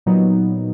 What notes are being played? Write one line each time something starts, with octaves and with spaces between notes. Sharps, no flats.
A#2 F#3 B3 D#4